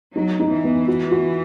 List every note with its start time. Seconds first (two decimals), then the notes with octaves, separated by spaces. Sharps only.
0.15 F#3 D#4
0.40 D#4
0.51 E3
0.64 B3
0.88 F#4
1.11 F#4